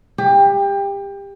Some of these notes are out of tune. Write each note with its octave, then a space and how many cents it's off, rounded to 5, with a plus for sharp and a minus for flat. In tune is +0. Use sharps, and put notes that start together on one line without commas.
G4 +25